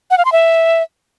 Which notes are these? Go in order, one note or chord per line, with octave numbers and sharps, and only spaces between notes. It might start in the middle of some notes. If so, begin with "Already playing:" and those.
F#5
F5
C6
E5